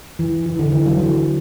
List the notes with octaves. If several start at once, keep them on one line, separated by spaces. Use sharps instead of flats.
E3
E3
D3
E3
F#3
E3